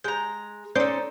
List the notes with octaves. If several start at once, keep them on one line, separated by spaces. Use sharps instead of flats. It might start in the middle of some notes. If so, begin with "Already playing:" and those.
G#3 A#5 G6
C#4 D#4 A4 C5 D5 G6